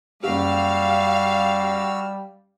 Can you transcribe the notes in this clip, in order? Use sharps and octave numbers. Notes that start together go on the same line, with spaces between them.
F#1 G3 F#4 G4 F5 E6 F6